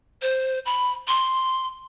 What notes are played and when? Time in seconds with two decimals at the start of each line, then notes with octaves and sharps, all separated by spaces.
0.22 C5
0.66 B5
1.08 C6